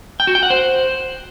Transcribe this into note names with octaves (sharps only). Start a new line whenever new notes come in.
G5
F#4
G5
F#5
C5